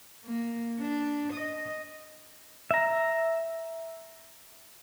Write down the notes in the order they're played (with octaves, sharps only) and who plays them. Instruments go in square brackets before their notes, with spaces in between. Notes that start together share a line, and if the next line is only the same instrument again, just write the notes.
[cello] A#3
D4
D#5
[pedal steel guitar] E5 A#5